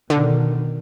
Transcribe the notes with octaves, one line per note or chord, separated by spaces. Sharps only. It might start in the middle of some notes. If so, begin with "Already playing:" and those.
B2 D3 D#3